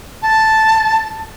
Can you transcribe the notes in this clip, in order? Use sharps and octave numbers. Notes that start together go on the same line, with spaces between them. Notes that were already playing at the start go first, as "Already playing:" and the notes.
A5